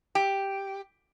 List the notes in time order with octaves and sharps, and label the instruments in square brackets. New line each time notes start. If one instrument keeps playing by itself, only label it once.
[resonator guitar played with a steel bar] G4